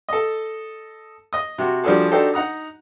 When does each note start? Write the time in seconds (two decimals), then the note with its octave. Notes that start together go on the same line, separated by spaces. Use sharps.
0.09 A4 D#5
1.33 D#5 D#6
1.58 C3 F#4
1.84 F3 G3 D4 F#4 G#4 A4
2.11 D4 D#4 F#4 G4 A4 C5
2.34 D#4 F#5 A#5 D#6